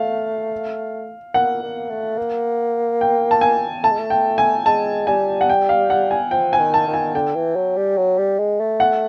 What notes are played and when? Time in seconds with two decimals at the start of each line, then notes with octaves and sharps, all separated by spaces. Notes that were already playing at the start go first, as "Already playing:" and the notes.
Already playing: A3 F5
1.34 A#3 F#5
1.63 A#3
1.90 A3
2.18 A#3
3.01 G5
3.31 A5
3.41 G#5
3.83 A3 A5
3.91 G#3
3.99 A3
4.10 G5
4.38 G#5
4.66 G#3 A5
5.07 G3 G#5
5.41 F#5
5.50 G5
5.69 F5
5.90 F#5
6.11 G#5
6.31 F3 G5
6.53 G#5
6.59 D#3
6.74 A5
6.88 D#3
6.94 G#5
7.14 D3 G5
7.35 E3
7.56 F#3
7.77 G3
7.97 F#3
8.18 G3
8.39 G#3
8.60 A3
8.80 F#5